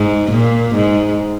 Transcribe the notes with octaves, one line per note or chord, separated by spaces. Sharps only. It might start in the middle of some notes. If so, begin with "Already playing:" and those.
Already playing: G#2
A#2
G#2